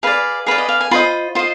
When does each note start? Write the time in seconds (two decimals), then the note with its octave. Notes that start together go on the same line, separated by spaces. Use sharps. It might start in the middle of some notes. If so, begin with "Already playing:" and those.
0.03 G#4 B4 D5 F5
0.46 G#4 B4 D5 F5
0.58 D#5
0.69 F5
0.81 G#5
0.91 F4 C5 D#5 B5
1.35 F4 C5 D#5